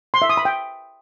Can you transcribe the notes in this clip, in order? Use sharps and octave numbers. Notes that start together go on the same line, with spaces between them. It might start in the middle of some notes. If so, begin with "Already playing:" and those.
C6
E5
D#6
B5
G5